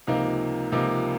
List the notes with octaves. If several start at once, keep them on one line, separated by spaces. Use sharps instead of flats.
C#2 C3 F3 A#3 D#4
C#2 C3 F3 A#3 D#4